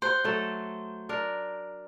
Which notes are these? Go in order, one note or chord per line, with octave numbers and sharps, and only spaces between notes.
C5 F#5
F#3 A3 A4
D4 A#4